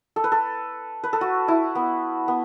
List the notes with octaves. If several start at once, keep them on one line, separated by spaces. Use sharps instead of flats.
A4
B4
A4
B4
A4
F#4
E4
B3
B3